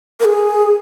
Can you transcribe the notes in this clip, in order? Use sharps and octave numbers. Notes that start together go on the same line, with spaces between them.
A#4
G#4